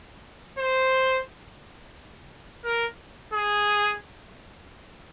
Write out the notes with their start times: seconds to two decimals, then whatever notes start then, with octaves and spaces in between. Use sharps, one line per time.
0.58 C5
2.64 A#4
3.33 G#4